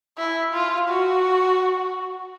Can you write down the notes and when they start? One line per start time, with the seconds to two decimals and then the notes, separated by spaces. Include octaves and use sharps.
0.18 E4
0.54 F4
0.89 F#4